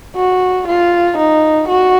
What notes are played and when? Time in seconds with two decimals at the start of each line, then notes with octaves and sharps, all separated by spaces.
0.16 F#4
0.67 F4
1.18 D#4
1.68 F#4